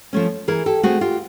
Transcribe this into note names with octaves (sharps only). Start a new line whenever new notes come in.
F3 A3 C#4
E3 G#4 A#4
G4 A4
A3 C4 F#4 G#4
F4 G4